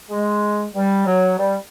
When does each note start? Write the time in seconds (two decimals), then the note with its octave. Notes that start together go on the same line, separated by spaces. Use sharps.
0.10 G#3
0.74 G3
1.06 F#3
1.38 G3